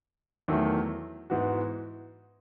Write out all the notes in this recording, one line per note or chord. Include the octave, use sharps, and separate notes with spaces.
E2 D#3 F#3 A3 E4
G#2 E3 B3 F#4